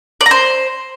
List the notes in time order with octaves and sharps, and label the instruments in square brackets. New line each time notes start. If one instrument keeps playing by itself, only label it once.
[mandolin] D5
A#5
C5